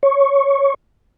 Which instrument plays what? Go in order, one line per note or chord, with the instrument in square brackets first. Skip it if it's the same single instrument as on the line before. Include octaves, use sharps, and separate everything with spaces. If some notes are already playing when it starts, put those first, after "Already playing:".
[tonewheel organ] C#5